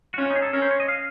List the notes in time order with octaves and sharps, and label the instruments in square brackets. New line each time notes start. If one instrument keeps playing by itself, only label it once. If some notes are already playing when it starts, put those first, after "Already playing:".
[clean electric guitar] F#4
[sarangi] C#4 [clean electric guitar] F4
[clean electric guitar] D#4
G#4
A4
[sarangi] C#4 [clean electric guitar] A#4
[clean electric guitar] C5
C#5
D#5
F5